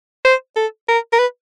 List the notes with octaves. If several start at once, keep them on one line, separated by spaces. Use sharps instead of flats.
C5
A4
A#4
A#4
B4